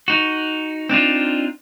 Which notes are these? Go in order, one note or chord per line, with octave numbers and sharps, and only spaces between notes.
D#4 F#4
C4 D4 D#4 F4